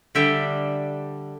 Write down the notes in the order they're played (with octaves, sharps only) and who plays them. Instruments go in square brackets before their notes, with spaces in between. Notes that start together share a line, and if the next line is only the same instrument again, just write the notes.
[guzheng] D3 G3 D4 E5 G5